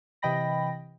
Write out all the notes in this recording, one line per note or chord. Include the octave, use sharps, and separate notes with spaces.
C3 E3 D#5 G5 B5 A#6